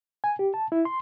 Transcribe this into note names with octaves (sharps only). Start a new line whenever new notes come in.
G#5
G4
A5
E4
C6